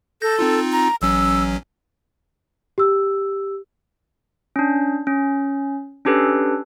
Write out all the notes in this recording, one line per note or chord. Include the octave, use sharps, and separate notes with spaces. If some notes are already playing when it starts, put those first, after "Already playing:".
A4 G6 A#6
C4 D#4 F4
A#5
A1 F#3 C#4 E6
G4 E6
C#4 D4
C#4
C#4 D4 G4 A4 B4